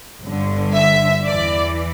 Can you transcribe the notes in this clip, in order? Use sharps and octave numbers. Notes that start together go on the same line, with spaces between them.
G1 G2 D3
E5
E2 E3 D5